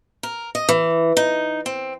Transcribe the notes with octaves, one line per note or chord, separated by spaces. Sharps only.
A#4
D#5
E3
D#4
C4